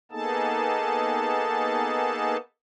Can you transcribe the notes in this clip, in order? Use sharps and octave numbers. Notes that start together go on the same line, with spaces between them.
A#3 B3 D#4 G#4 A4 A5